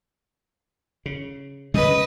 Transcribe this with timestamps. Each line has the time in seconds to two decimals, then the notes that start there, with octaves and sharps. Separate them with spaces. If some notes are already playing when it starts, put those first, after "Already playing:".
1.06 C#3
1.74 C#3 G3 G#3 B4 D#5